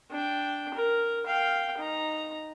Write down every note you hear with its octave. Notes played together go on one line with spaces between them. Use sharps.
D4 G5
A#4
F5 G5
D#4 A#5